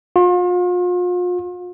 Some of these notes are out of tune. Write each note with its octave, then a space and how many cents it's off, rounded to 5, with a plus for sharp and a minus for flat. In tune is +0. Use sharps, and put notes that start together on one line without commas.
F4 +40